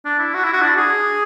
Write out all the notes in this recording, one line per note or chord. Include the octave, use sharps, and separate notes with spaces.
D4
E4
F#4
E4
F#4
D4
G#4